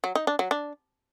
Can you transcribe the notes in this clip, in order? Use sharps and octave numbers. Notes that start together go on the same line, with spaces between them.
F#3
D#4
D4
F#3
D4